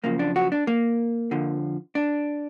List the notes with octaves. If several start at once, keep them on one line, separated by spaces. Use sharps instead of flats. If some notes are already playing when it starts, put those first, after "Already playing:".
F#2 C#3 F3 A#3
D4
F#4
D4
A#3
F2 D3 F3
D4